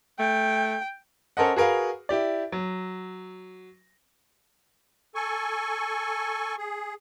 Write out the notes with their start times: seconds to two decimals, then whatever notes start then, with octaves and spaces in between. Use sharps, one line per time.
0.19 A3 G5
1.37 C#4 A4 A#4 C5 D#5 F#5
1.56 F#4 G#4 A#4 B4 F5
2.09 E4 G4 D5
2.52 F#3
5.15 A4 G#5 C#6
6.58 G#4